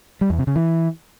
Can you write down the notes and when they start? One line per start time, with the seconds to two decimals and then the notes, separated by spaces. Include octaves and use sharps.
0.21 G3
0.30 E2
0.38 C3
0.47 C#3
0.56 E3